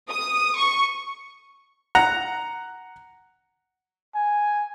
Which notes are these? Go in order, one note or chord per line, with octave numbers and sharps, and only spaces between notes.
D#6
C#6
F#5 A#5
G#5